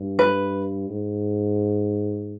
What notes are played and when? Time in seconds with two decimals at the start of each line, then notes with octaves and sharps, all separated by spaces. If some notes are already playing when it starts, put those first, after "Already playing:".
Already playing: G2
0.19 B4
0.90 G#2